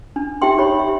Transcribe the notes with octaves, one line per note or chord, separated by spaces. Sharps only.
D4
D#4 G4 E5 G5 C6
D#4 G4 C#5 B5
E5